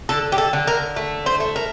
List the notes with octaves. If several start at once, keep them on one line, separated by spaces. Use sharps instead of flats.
D3 A4
G4
A4
D3
A#4
A3
C5
A3
A#4